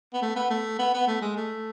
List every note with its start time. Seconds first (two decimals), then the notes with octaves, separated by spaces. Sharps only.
0.14 B3
0.22 A3
0.36 B3
0.50 A3
0.79 B3
0.93 B3
1.07 A3
1.22 G#3
1.36 A3